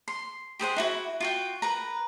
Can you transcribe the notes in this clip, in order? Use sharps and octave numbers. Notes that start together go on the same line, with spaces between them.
C6
G4 G#4 C5 F#5
D#4 E4 F#4
F4 F#4 G5
A#4 B4 A#5